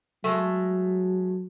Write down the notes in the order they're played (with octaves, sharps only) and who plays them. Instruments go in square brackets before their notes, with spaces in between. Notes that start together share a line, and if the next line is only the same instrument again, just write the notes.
[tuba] F#3 [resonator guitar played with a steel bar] G#3 A3